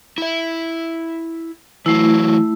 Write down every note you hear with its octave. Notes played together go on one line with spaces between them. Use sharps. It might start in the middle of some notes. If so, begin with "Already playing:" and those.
E4 E5
E3 F#3 A3 E4